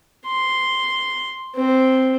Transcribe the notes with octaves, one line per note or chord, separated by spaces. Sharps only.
C6
C4